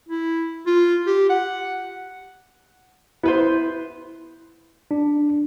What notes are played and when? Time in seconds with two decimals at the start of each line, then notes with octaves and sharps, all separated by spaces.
0.09 E4
0.67 F4
1.07 G4
1.29 F#5
3.23 B3 E4 B4 C5
4.91 D4